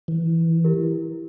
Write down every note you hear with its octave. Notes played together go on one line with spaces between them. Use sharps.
E3
E4 G4 A#4